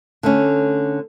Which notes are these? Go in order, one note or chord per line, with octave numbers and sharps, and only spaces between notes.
D3 A3 C#4